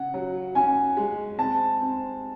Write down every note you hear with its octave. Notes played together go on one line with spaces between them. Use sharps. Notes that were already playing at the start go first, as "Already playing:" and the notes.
Already playing: C#3 F#5
F#3
C#4 G#5
G#3
C4 A5
C4